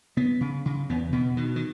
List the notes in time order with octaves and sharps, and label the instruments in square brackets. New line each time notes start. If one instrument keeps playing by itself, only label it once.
[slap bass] C#3 B3
C#3
C#3
E2 B3
B2 B3
B2 D#3
D#3